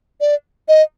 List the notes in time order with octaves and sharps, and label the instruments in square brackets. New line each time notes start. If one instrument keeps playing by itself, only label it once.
[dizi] D5
D#5